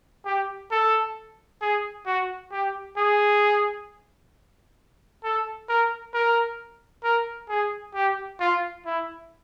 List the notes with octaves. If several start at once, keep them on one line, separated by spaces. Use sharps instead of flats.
G4
A4
G#4
F#4
G4
G#4
A4
A#4
A#4
A#4
G#4
G4
F4
E4